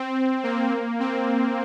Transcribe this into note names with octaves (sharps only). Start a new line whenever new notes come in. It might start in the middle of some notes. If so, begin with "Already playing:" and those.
Already playing: C4
A#3
C4